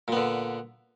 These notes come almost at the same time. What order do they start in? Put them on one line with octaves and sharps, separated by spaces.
A#2 B3 D3